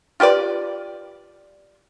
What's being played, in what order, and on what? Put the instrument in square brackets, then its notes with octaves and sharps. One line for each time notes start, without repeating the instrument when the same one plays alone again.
[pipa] F4 G4 B4 D5